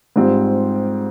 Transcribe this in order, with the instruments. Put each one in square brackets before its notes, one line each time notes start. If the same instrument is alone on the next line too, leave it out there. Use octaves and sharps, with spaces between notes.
[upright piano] G#2 G3 C4 F4